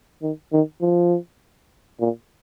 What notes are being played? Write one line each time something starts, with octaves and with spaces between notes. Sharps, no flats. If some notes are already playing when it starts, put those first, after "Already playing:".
D#3
D#3
F3
A#2